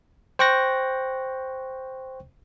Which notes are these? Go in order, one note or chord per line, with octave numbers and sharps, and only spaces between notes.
C5 G5 C#6 F#6 A#6